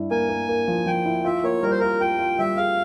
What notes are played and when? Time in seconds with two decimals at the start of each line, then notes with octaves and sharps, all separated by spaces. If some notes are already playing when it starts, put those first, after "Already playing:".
Already playing: G2 E4
0.11 A#3 G#5
0.29 A#3
0.49 A#3
0.68 F3
0.86 F3 G5
1.05 E4
1.25 F4 E5
1.44 A#3 C#5
1.63 G3 A#4
1.71 C5
1.79 F4 A#4
2.01 F4 G5
2.19 F4
2.39 G3 E5
2.57 G#4 F5